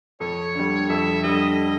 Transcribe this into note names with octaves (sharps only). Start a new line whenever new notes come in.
F2 C#5
D3 G3
F2 E5
D3 G3 D#5